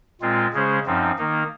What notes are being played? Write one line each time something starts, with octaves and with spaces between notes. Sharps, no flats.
A#2 G#3 C4 F4
C#3 G#3 C#4 G#4 C5
F#2 F3 C4 D#4
D#3 A#3 D#4